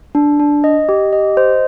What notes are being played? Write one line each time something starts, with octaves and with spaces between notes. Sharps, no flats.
D4
D4
D#5
G4
D#5
C5